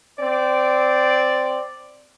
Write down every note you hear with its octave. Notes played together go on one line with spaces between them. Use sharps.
C4 D5